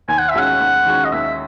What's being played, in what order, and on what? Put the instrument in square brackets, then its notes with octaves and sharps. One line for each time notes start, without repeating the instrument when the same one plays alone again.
[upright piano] D#2 [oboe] G#5
[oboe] F#5
E5
[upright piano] D#3 G#3 C#4 F#4 [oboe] F#5
[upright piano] D#2
D#3 G#3 C#4 F#4
[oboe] D#5
[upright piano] D#2 [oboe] E5